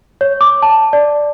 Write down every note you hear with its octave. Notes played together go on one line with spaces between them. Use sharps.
C#5
D6
A5
D5